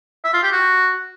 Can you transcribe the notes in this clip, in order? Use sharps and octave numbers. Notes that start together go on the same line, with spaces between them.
E5
F4
G4
F#4